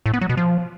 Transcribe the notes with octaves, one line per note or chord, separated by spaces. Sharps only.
A2
B3
F#3
B2
F3